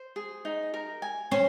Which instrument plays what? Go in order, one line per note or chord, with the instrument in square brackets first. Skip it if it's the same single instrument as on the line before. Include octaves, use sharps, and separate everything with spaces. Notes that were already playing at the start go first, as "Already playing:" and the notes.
Already playing: [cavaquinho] C5
G#4
D#4
A#4
G#5
[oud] C#4 [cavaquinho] C5